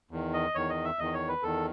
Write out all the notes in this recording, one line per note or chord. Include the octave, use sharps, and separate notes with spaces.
E2 D#3
D#5
E2 D#3 C#5
D#5
E5
E2 D#3 D#5
C#5
B4
E2 D#3 A4